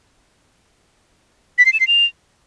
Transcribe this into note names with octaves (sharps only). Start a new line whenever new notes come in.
B6
C7
E7
C7
F7